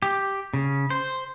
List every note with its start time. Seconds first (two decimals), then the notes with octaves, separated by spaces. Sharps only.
0.03 G4
0.54 C#3
0.90 C5